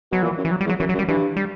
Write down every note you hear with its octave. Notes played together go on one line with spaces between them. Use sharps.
B2 F#3
A#2 E3
F#2
E3
F#3
G3
E2
F#3
F#2 E3
F#3
F#2
G3
G2 E3
G3